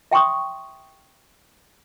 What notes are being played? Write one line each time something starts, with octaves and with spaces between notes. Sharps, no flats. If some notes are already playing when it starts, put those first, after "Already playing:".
E5 G5 C6 C#6 D#6